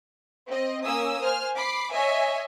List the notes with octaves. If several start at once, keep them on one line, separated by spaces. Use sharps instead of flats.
C4 D#5
A#3 C#4 G#5 D#6 E6
C5 G#5 F6
B5 D6 C7
C#5 D#5 E5 G#5